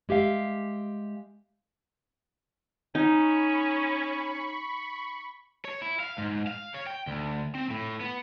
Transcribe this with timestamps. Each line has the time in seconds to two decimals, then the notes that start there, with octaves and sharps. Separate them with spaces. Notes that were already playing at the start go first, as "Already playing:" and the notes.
0.09 G#3 G4 E5 F5
2.95 C#4 D#4 B5 C#6
5.65 C#5
5.82 E4
6.00 F5
6.18 G#2
6.47 F5
6.74 C#5
6.87 G5
7.07 D2
7.55 C4
7.70 A2
8.00 B3